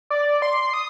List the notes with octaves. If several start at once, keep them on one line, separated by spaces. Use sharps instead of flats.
D5
C6
D#6